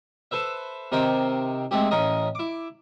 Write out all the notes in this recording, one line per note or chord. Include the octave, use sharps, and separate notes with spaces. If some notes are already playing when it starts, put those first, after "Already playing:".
A4 B4 C5 E5
C3 D#3 A#4 C5 G5
G#3 A3 C4 G4
A1 C#4 A#4 D#5
E4 D6